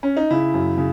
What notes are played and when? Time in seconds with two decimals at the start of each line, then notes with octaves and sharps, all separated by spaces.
0.03 C#4
0.17 D#4
0.30 C#3 E4
0.54 F#2
0.78 C#3